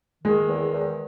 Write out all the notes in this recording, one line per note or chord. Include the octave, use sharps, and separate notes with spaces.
D#3 G#3
E2
E2